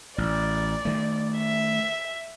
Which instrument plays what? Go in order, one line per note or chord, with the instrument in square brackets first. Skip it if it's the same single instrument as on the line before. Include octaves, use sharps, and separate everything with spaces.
[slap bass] A1 [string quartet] D5
[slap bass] D#3 A3
[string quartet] E5